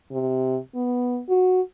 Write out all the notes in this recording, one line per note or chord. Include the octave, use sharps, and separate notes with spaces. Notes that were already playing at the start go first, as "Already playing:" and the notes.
C3
B3
F#4